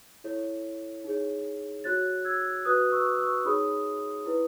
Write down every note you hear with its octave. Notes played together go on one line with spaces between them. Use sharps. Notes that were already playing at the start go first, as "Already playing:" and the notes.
E4 A4 C#5
D#4 G#4 C#5
F#4 C#5 F#6 A6
E6 G#6
F#4 B4 D#6 F#6
C#6 E6
C#6 E6
D#4 G#4 C#5 B5 D#6
E4 B4